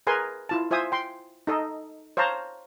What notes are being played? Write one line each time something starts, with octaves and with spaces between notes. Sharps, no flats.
G#4 A#4 B4 G#5 C6
E4 F4 A5
F4 C5 E5 G#5 D#6
G5 C6
D#4 A4 D#5
C5 C#5 F5 A5 A#5